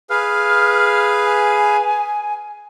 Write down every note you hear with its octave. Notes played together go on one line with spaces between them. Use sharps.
G#4 B4 F5 F6
G#5